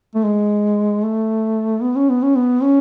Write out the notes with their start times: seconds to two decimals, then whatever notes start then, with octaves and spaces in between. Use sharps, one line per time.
0.15 A3
0.24 G#3
1.03 A3
1.82 B3
1.96 C#4
2.10 B3
2.23 C#4
2.36 B3
2.63 C#4